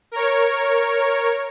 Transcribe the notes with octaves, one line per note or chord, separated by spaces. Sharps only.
A#4 C#5